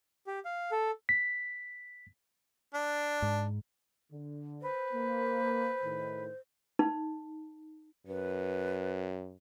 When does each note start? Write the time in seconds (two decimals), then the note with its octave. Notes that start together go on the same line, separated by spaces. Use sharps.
0.27 G4
0.45 F5
0.71 A4
1.09 B6
2.74 D4
3.22 G#2
4.11 D3
4.62 B4 C5
4.93 A#3
5.83 A2 D#3
6.79 D#4
8.07 F#2 B4